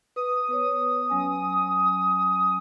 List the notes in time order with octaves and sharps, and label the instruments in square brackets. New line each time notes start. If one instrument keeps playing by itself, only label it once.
[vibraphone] B4 [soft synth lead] D#6
[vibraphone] B3 B4 C#5
F#3 C#4 G#5